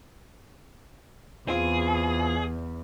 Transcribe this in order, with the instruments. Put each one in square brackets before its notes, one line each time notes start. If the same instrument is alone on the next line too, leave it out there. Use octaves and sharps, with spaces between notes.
[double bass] E2 [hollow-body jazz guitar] C4 F4 [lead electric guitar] G#4